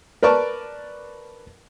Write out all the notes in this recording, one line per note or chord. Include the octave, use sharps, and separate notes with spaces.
A#4 B4 D5 A5 C#6